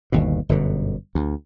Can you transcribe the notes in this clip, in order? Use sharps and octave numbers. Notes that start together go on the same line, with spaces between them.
G1 D#2 B2
G1 F#2 B2 D3
D2